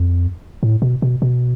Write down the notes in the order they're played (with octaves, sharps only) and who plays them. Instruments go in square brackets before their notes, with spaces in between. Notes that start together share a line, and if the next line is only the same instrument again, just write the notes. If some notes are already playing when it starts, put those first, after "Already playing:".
Already playing: [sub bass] F2
A2
B2
B2
B2